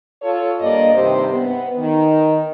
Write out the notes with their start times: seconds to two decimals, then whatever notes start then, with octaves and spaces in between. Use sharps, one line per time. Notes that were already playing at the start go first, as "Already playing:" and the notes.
0.22 F4 A4 C#5
0.60 G2 A#3 D5 D#5
0.94 G2 C3 D#3 G4 C5
1.31 B3
1.77 D#3